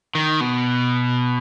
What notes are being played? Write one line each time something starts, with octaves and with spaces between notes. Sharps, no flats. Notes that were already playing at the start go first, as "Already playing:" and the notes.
D#3
B2